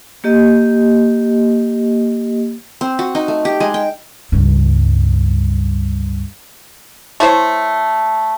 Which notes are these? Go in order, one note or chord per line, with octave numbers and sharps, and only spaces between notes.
A#3 G4 D#5
C4
F#4
D#4
A3
G4
G#3
G5
C#2 G2
A3 E4 C5 C#5